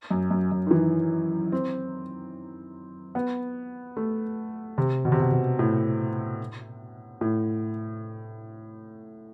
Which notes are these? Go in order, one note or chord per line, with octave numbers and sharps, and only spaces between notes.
F#2
F#2
F#2
D#3
E3
C4
B3
A3
C3
B2
C3
B2
B2
A2
A2